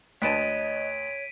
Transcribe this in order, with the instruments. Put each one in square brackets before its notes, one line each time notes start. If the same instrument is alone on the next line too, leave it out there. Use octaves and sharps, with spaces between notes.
[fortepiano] D2 B4 A5 [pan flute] C#5 [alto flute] D#5 [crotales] B6 D7 D#7